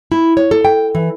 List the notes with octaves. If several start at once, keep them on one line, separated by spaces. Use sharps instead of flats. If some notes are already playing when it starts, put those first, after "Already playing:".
E4
C#5
A4
G5
E3